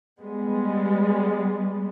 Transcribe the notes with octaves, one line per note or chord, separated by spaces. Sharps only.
G3 G#3 B3